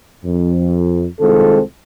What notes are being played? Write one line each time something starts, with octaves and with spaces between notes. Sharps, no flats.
F2
C2 D#3 G#3 C4 F4 A4